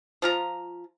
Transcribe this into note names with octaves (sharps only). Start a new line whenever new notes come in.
F3 F4 A#5